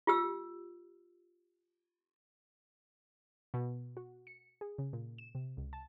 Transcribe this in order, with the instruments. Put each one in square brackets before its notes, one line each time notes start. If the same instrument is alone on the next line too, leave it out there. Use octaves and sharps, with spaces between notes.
[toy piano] F4 G4 E6
[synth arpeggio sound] B2
F#4
C#7
G#4
C#3
A#2
E7
C3
C#2
A5